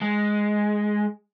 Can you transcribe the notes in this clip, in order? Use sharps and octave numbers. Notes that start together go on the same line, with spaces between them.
G#3